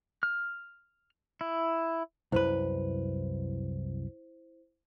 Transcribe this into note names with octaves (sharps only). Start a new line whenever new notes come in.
F6
E4
C2 F#2 E4 B4 C5